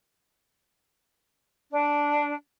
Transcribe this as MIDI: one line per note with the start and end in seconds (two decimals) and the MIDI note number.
1.69 2.33 62